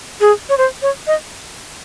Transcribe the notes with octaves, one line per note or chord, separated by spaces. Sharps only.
G#4
C#5
C5
C#5
D#5